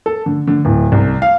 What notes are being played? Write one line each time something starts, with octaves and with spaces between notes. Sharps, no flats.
A4
D3
D3
D1
C2
F5